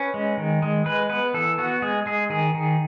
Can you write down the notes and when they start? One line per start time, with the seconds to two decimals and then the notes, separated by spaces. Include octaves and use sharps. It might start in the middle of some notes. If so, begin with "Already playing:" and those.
Already playing: C#4 B4
0.14 G#3
0.37 D#3
0.62 G#3
0.86 G#3 B4
1.10 B3 B4
1.34 E3 A4
1.58 B3 F#4
1.82 G#3 G#4
2.06 G#3 G#4
2.30 D#3 G#4
2.54 D#3